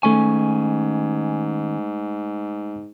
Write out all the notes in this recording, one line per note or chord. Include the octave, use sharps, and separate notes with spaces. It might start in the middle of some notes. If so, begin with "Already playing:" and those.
G#2 D#3 A3 C#4 G#5 C#6